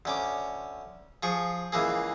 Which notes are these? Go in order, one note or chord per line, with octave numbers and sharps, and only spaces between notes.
D2 C#4 D6
F3 G#4 C#6
C#2 E3 A#3 G#4